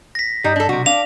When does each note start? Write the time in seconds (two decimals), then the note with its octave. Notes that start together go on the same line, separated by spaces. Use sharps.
0.15 A#6 B6
0.44 G2 G3 D#4
0.56 D4 A4
0.69 B1 C3 F#4
0.86 D4 F5 F7